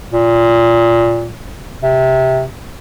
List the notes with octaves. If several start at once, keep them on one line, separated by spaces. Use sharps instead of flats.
A#2
C3